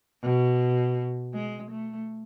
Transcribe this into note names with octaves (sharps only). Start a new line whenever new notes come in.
B2
G#3
A3